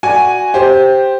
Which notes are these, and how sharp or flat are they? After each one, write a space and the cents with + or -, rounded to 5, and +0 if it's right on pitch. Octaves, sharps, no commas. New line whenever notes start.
F#4 +0 D5 +0 G#5 +0
G4 +0 C5 +5